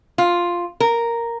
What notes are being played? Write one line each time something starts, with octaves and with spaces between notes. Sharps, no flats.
F4
A#4